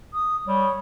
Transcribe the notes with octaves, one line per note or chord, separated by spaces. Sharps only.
D#6
G3 C#5